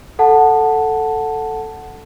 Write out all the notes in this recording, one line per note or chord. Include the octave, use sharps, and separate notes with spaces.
A4 F#5 A5